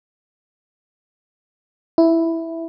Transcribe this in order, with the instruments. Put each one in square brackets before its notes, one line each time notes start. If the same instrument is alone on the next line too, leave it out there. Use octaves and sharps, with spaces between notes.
[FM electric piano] E4